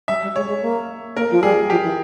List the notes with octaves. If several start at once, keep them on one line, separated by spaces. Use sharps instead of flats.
G3 E5
G3
G#3 C#5
G#3
A#3
A#3 A#4
F3
G3 G#4
F3 G4
E3